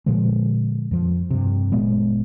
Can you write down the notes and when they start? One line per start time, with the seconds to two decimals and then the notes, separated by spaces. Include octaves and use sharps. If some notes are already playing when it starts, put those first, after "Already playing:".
0.06 A#2 D3 F3 G#3
0.91 F2 F3
1.30 G2 C3
1.72 F#1 A#2 G#3 B3